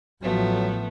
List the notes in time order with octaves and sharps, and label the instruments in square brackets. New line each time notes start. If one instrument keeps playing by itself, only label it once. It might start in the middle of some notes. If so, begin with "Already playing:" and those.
[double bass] A1 F3 [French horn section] F#3 [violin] A3 B3